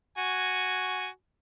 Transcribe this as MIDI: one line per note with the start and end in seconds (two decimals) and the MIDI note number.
0.18 1.08 66
0.18 1.08 80